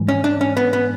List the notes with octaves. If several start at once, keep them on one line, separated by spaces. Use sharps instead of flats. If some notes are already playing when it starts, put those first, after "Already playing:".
Already playing: G#2 E3 G3
C#4
D4
C#4
B3
B3